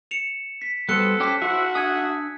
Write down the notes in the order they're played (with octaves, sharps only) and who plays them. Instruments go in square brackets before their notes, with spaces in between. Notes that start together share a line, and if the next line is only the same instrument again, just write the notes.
[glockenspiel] C#7 E7 F7
B6
[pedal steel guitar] G3 B3 C5 [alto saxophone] A4 [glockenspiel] F#6 C#7
[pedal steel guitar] C#4 G4 C5 [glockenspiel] A5 B6
[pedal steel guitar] E4 C5 E5 [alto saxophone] F#4
[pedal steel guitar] D4 E5 D#6 [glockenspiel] G#5 G#6